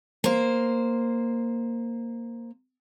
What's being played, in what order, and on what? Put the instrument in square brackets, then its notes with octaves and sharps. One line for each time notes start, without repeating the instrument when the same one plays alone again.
[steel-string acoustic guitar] A#3 C5